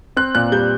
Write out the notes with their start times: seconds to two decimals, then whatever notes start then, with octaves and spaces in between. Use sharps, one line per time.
0.17 C4 F#6
0.35 A#2 F#6
0.52 G3 G6